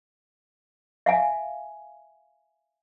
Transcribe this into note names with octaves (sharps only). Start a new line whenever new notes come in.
E5 F5 G#5